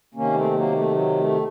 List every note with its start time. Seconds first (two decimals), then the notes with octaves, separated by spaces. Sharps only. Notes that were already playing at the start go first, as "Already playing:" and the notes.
0.15 C3 D#3 A#3 C#4
0.33 A3 C4
0.53 F#3 A#3
0.72 A3
0.92 F#3
1.17 A3